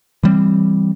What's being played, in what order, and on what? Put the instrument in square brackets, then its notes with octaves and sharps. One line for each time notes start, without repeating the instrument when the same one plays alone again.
[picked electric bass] E3 G3 C4